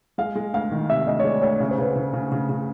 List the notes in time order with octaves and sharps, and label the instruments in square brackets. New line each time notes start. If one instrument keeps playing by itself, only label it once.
[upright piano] G#3 [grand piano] F5
[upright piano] G#3
[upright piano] D2 [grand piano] F5
[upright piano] D#3
[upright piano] C3 [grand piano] E5
[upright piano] D2 [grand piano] D#5
[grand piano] C#5
[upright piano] G#3 [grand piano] D5
[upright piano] D2 [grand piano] C#5
[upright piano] C#3 [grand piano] C#5
[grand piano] C5
[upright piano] C#3 [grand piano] B4
[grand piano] C5
[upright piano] C#3
C#3
C#3
C#3